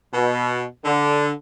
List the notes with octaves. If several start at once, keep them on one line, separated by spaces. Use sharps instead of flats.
B2
D3